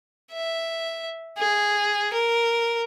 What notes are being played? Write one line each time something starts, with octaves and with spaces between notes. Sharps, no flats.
E5
G#4
A#4